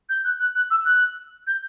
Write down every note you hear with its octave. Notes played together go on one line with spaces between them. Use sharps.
G6
F#6
F#6
F#6
E6
F#6
G6